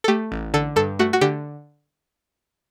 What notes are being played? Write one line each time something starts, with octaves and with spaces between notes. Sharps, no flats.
A4
A3 G4
A1
D3 A4
G2 A4
A3 F#4
F#4
D3 G4